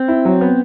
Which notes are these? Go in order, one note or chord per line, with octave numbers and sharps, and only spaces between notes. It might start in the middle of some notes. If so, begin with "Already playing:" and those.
Already playing: C4
E4
F#3
B3